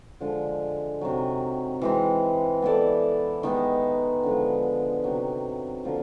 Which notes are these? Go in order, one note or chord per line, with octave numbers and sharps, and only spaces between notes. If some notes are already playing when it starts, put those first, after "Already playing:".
D3 F3 G#3
C3 D#3 F#3
E3 G#3 C4
B3 E4 A4 D5
D#3 G#3 B3 D#4
D3 F3 G#3
C3 D#3 F#3
D3 F3 A#3